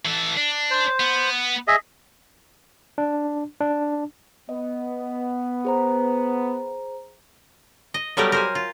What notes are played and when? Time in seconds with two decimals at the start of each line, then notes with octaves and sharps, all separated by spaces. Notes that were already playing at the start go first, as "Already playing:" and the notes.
0.05 E3 A4
0.37 D4
0.71 C5
1.00 B3
1.68 G#4 D#5 E5
2.98 D4
3.61 D4
4.49 B3 D#5
5.65 G#4 C5 A#5
7.94 D#5
8.17 F#3 G3 A3 B3 G4 A#4
8.32 A#4 C5 G#5
8.55 F4